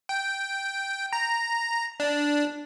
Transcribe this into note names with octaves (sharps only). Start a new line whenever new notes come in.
G5
A#5
D4